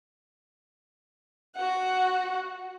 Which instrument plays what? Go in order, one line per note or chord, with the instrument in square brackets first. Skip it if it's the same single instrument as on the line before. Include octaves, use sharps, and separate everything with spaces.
[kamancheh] F#4 F#5